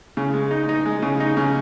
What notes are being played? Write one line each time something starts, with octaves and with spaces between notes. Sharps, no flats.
C#3
G#3
D#4
D#4
G#3
C#3
D#4
C#3